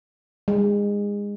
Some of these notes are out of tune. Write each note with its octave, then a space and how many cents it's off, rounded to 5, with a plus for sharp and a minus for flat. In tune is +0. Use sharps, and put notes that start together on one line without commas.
G#3 -25